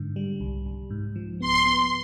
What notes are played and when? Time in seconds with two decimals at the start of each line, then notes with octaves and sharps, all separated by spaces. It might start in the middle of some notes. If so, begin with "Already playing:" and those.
Already playing: G#2 D3
0.16 G3
0.41 C2
0.66 C2
0.91 G#2
1.16 F3
1.40 B3 C6
1.65 B3